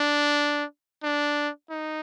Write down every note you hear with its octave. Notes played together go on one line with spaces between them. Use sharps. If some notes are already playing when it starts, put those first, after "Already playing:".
Already playing: D4
D4
D#4